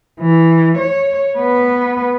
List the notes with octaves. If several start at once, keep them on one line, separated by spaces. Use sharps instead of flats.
E3
C#5
B3 B4